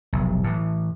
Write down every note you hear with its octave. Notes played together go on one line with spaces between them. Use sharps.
F1 B1
A2 E3